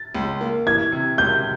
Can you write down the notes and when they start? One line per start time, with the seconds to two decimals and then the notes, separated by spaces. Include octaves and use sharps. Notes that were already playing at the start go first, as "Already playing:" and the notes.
Already playing: A6
0.15 C#2
0.41 A#3
0.67 E3 G#6
0.92 C3
1.18 C#2 G6